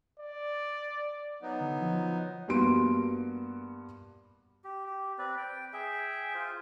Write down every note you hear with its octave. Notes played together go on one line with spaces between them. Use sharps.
D5
F#3 B3 D#4
D3
F3
G2 A#3 B3 F#4 C6 D7
G4
G4
C4 B4 D5
G5
G#4 E5 G5
F4 C5